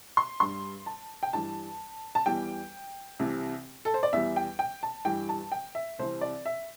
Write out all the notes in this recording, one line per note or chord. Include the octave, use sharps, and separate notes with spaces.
C6
G2 G3 C6
A5
G5
G2 E3 G3 A5
A5
E2 E3 G3 G5
C2 C3 E3
A4
C5
D5
E2 E3 G3 E5
G5
G5
A5
G2 E3 G3 G5
A5
G5
E5
C2 C3 E3 C5
D5
E5